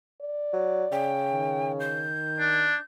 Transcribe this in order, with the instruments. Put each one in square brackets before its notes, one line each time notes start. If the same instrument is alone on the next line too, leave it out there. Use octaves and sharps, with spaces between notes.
[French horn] D5
[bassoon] F#3
[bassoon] C#3 [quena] G5
[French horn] D#3
[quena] G6
[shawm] D4